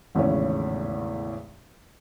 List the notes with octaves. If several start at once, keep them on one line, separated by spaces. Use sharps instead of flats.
G#1 E2 A2 C#3 C#4